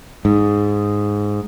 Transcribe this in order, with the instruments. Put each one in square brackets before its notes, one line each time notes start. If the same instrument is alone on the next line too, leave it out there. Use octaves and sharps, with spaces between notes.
[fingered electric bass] G#2